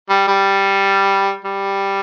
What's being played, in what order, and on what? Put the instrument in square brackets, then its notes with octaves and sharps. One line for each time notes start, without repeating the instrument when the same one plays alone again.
[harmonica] G3
G3
G3